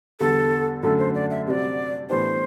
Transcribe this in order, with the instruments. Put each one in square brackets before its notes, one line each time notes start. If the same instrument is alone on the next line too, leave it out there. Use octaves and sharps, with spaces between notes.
[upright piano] E2 D3 G3 [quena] A4
[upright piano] F#2 D3 A3 [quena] A4
[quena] C5
D5
E5
[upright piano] C3 G3 C4 F#4 [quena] D5 E5
[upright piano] A2 E3 B3 D4 G4 [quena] C5